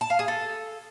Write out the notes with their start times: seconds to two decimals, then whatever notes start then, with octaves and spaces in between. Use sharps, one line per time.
0.01 A5
0.10 F5
0.19 G#4
0.28 A4